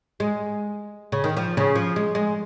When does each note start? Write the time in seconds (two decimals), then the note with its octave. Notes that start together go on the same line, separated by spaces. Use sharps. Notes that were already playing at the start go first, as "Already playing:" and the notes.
0.20 G#3
1.12 C#3
1.24 D#3
1.37 F3
1.57 C#3
1.75 F3
1.96 G#3
2.15 G#3